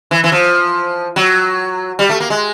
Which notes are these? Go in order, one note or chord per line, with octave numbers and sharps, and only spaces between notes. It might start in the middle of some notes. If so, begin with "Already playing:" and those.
E3
E3
F3
F#3
G3
A3
A#3
G#3